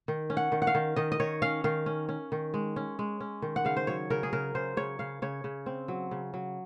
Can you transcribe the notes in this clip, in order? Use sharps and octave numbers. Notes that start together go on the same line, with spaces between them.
D#3
C#4
F#5
D#3
F#5
F5
D#3
D#3 D#5
D#5
D#3 C#5
C#4 F5
D#3 F5
C#4
C#4
D#3
G#3
C#4
G#3
C#4
D#3
F#5
C#3 F5
C5
F#3 C#5
C#3 A#4
G#4
C#3 A#4
C#3 C5
C#3 C#5
C#3 F5
C#3 C#5
C#3
C4
F#3
C#3
F#3